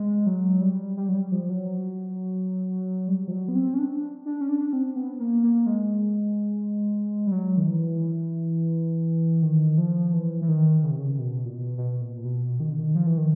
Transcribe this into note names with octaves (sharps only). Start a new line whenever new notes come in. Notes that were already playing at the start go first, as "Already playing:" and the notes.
Already playing: G#3
F#3
G3
G3
F#3
G3
F3
F#3
G3
F3
F#3
B3
C4
C#4
D4
D4
C#4
D4
C4
B3
A#3
A#3
G#3
G3
F#3
D#3
E3
D#3
F3
E3
E3
D#3
C#3
C3
C#3
B2
A#2
B2
B2
A#2
A#2
B2
D#3
D3
D#3
F3
E3
D#3